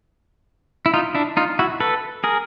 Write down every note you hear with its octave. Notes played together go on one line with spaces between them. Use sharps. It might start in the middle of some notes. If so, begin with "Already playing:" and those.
E4
D#4 F4
D4 E4
D#4 F4
E4 F#4
A4 B4
G#4 A#4